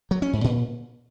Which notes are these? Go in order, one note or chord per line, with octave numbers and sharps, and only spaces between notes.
F#3
C#4
G#2
A#2